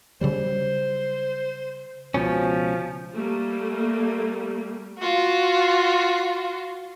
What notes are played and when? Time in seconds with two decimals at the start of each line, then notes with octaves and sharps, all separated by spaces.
0.21 C#3 F#3 G3 C5
2.14 C#2 B2 F3 C#4
3.14 G3 A3 A#3
4.99 F4 F#4